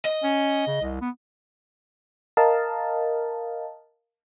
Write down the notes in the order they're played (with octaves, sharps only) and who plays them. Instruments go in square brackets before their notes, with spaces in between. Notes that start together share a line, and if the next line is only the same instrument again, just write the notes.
[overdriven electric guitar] D#5
[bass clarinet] C#4
C#3
C2
B3
[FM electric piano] A#4 D#5 F5 A5